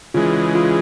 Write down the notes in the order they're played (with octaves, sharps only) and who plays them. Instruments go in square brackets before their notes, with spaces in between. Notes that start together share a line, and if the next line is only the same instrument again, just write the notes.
[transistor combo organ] C#3 E3 G#3 [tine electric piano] F4
[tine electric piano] F4